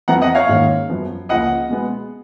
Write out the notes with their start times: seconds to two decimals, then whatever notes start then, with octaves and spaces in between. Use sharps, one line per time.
0.08 F2 F3 B3 F#5 A#5
0.21 D#5 F#5
0.35 C#5 F5
0.49 G#2 D#3 A#3 C#4
0.89 F#2 F3 B3
1.29 C#2 C#3 F3 A#3 D#5 F#5
1.69 B2 G#3 B3